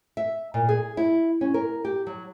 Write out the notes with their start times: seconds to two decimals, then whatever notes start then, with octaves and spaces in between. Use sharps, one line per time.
0.17 E5
0.54 A#2
0.69 G#4
0.97 E4
1.41 C#4
1.54 A#4
1.85 G4
2.07 F#3